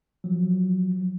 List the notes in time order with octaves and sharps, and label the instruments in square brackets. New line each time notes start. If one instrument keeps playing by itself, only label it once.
[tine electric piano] F3 F#3